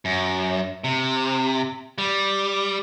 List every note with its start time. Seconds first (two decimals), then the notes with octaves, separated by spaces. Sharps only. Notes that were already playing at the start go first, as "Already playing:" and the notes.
0.05 F#2
0.84 C3
1.98 G3